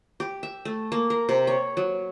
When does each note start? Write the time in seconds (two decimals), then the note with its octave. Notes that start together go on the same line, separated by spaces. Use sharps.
0.20 G4
0.43 E5
0.65 A3
0.92 A#3
1.10 A#4
1.29 C3
1.47 C#5
1.77 F#3